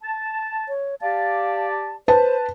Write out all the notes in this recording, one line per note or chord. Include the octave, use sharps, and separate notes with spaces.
A5
C#5
G4 D5 F5 A5
B4 C5 A5